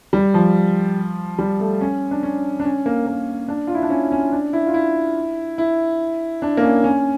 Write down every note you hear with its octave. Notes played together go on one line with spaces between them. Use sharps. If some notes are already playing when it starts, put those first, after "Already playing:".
G3
F3
G3
A3
C#4
D4
C#4
D4
C#4
A#3
A#3
D4
F4
E4
D4
C#4
C#4
D4
E4
F4
E4
E4
D4
A#3
C#4
C#4